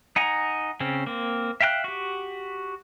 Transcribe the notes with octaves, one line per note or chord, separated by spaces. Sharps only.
D#4 F#5 G#5 A#5
C#3 C4 C#4
A#3 C4
E5 F5 G5 A5 F#6
F#4 G4